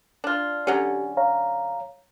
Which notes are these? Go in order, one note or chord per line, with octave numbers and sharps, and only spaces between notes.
D4 F4
D3 F#3 C#4 G4
C#5 F5 A#5